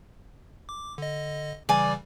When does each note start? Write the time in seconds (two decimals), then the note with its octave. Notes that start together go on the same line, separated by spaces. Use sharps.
0.69 D6
0.98 D3 D#5
1.69 C#3 E3 G3 D5 G#5